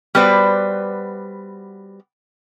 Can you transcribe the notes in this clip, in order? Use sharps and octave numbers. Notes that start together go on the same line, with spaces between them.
G3 B3 F#4 B4 C5 D5